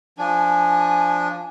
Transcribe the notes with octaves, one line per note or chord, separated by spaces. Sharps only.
F3 D4 G#5